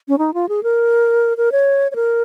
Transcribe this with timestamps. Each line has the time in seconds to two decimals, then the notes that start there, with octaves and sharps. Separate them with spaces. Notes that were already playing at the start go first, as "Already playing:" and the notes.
0.08 C#4
0.18 D#4
0.34 F4
0.49 G#4
0.63 A#4
1.37 A#4
1.52 C#5
1.92 C#5
1.96 A#4